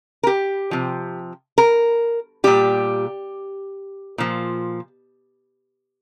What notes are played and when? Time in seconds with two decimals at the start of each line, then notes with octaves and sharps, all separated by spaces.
0.23 A#4
0.27 G4
0.71 C3 F3
1.58 A#4
2.44 A#2 G3 G4
4.18 A#2 F3